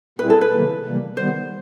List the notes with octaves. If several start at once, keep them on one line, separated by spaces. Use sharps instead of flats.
A#2 G3 C4 E4 G#4 B4
A4
B4
C3 D#3 F#3 A#3
C3 E3 G3 A#3
D#3 G3 B3 C5